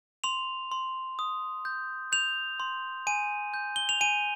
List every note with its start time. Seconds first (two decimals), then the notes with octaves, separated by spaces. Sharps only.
0.24 C6 F7
0.72 C6
1.19 D#6
1.65 G6
2.12 G6 F7
2.60 C6
3.07 G#5 D#7
3.54 G6
3.76 G7
3.89 F7
4.01 G#5 D#7